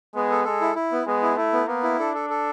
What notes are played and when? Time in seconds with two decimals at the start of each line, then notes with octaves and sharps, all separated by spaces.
0.14 G#3 B3
0.30 A4
0.45 G#3 A4
0.61 E4
0.75 E4
0.92 B3
1.07 G#3 B3
1.23 E4
1.37 A3 E4
1.53 B3
1.68 A#3 B3
1.83 E4
1.99 D4 A4
2.15 A4
2.30 A4